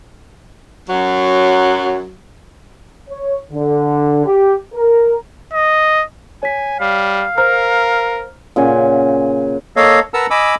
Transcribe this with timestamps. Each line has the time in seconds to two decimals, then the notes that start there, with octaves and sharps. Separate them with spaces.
0.88 F#2 F#3
3.10 C#5
3.52 D3
4.26 G4
4.74 A#4
5.53 D#5
6.43 C#5 G#5 B6
6.80 G3 F5
7.38 A#4 C5 A#5 F6
8.56 A#2 C#3 F#5 G#5
9.76 A#3 A4 C#5 D#5 F5
10.14 A#4 B4 F#5 A5 A#5 E6
10.30 D#5 G#5 B5 D6 E6